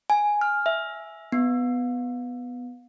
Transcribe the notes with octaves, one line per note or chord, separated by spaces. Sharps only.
G#5
F6
E5
B3